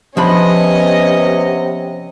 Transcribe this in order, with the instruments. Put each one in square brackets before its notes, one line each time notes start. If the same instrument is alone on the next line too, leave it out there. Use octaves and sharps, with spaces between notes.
[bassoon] C3 [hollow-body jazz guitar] F3 D4 B5 [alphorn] B3 [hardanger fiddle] C#4 D#5